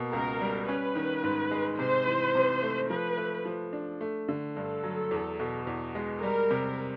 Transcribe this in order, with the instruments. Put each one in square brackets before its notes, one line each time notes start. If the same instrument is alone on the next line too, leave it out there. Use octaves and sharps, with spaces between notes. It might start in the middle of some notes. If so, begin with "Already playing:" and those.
Already playing: [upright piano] B2 A#3
[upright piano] C#2 [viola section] A#4
[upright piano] G3
[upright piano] C#4 [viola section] B4
[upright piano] D#3
G#2
G#3
[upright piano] C3 [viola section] C5
[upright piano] E3
C3
A3
[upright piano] F3 [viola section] B4
[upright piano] A3
F3
D4
A3
D3
[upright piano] G2 [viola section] A4
[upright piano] F#3
E2
B2
E2
G#3
[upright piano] G3 [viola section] A#4
[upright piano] C3